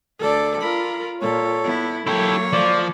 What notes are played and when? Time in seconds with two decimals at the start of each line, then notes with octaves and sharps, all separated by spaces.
0.20 D2 A4 D5
0.61 F4 A#4 B5
1.21 A#2 A4 C#5
1.63 B3 E4
2.07 F#3 A#3 E4 G4 A4 C#5
2.53 F3 D5